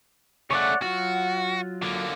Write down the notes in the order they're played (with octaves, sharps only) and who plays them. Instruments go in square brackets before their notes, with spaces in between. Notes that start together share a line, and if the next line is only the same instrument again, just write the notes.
[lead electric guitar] C#3 A3 [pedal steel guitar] C#5 D5 F#5
[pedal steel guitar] F#3 F4 [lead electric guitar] F#4
[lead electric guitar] D3 A#3